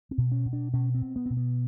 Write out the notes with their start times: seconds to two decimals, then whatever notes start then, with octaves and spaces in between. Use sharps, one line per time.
0.11 C4
0.18 B2
0.32 C#4
0.46 B2
0.53 D4
0.73 B2 C#4
0.95 C4
1.02 B2
1.16 B3
1.26 B2 C4
1.37 B3